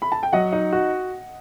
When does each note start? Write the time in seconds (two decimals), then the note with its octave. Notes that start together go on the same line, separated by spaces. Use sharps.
0.02 B5
0.12 A5
0.23 G5
0.33 F#3 D#5 F#5
0.53 D#4
0.73 F#4